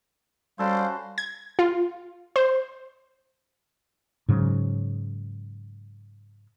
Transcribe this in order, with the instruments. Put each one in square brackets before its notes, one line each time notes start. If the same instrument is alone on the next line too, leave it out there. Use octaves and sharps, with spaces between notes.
[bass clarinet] G3 [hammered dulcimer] C#4 F#4 A4 [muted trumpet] C5 [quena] F5
[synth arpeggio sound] G#6
F4
C5
[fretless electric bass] G#2 C#3 F#3